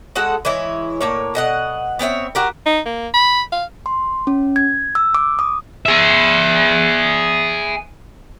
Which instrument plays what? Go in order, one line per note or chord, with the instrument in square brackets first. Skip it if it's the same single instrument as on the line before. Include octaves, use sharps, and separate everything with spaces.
[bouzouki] G#3 F#4 A4 F#5
E3 G#3 E4 C#5
A2 A#3 C#5
B2 D#5 F#5
B3 C4 C#5 E5
F#4 G4 A#4
[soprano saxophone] D#4
A#3
B5
F5
[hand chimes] C6
C#4
G#6
E6
D6
D#6
[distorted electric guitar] G#4 E5